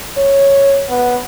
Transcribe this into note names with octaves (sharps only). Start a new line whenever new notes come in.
C#5
B3